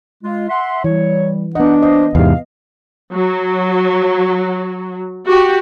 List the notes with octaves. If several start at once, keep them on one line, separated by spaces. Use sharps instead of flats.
G#3 F4
E5 F#5 C6
E3 G3 C#5
B3 D4 D#4 D#5 F#5
A#3 C5 D#5
E2 G#2 C3 F5
F#3
F#4 G4